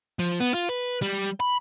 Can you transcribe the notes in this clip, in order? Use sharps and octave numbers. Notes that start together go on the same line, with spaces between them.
F3
B3
F4
B4
G3
B5